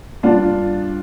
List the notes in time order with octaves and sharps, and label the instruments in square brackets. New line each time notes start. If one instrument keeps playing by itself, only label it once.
[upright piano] G2 D4 F4